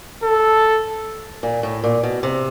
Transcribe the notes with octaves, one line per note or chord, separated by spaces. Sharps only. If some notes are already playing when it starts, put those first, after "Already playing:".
A4
A#2
A2
A#2
B2
C3